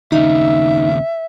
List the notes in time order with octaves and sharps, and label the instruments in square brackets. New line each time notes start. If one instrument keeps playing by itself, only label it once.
[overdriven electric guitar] D#2 C#3 [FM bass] D#4 [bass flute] E5